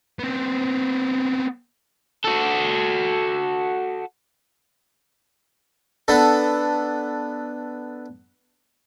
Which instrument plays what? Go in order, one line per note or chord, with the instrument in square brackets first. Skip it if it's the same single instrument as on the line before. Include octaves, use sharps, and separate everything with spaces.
[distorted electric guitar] B3 C4
[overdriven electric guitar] F#4 A4
[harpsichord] B3 D4 A4